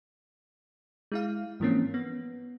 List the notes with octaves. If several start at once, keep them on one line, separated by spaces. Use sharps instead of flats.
G#3 E4 F5
G#2 E3 F3 A#3 C4 C#4
B3